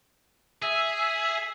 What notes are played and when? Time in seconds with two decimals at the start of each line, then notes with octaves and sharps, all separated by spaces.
0.62 G#4 E5